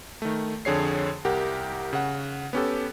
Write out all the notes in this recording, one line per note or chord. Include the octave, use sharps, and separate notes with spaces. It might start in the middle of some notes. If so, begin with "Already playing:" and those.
D#3 A3
F2 D3 G#4 C#5 C7
C2 G4 A#4 F#5
C#3 F#5
B3 C#4 G4 A4